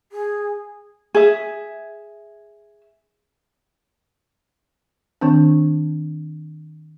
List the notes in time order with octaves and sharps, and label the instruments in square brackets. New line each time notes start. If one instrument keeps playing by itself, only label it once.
[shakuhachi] G#4
[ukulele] G#4 E5
[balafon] D#3 C4 D4